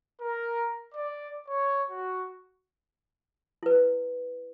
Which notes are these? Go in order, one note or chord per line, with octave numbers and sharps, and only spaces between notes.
A#4
D5
C#5
F#4
E4 B4